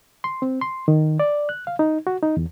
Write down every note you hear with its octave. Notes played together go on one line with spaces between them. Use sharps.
C6
C4
C6
D#3
D5
F#6
F5
D#4
F#4
D#4
E2